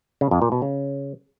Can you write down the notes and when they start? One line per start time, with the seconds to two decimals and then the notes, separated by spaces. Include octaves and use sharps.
0.21 C#3
0.31 F2
0.42 A#2
0.52 B2
0.62 C#3